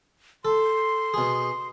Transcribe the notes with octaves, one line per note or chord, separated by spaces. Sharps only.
A4 C6
B2 G#4